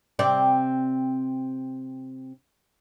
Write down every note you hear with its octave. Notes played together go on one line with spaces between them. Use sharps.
C3 C4 D5